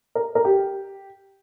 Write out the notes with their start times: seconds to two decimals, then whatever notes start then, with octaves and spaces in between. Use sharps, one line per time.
0.15 A#4
0.35 A#4
0.45 G4